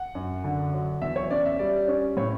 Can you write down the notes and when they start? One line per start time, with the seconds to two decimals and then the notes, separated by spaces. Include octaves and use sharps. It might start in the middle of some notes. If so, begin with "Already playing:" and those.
Already playing: F#5
0.15 F#2
0.44 D3
0.73 F#3
1.02 E2 E5
1.16 C#5
1.30 C#4 D5
1.46 E5
1.59 G3 D5
1.88 C#4
2.17 A2 C#5